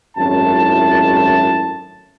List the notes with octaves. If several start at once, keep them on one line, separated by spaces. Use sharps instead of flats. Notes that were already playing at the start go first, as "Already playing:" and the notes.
G#1 F#2 A2 D#3 E4 A5